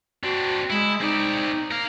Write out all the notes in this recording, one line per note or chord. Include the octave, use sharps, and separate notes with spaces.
C4 D4 F#4
G#3 E4
C4 D#4 D5
A#4 F5